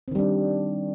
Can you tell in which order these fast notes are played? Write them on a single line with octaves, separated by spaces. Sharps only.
C4 D#3 G3 D4